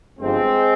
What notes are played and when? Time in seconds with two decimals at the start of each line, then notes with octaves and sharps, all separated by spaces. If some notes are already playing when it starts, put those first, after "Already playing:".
0.19 G1 G2 F3 G#3 C4